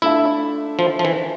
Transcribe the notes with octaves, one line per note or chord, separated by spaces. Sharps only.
A3 D4 E4 F4 A4 E5
F3
F3
E3